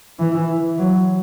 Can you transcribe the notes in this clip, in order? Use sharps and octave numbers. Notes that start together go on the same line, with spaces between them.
E3
F#3